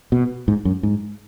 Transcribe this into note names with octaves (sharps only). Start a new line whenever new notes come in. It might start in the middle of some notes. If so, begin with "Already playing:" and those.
B2
G#2
F#2
G#2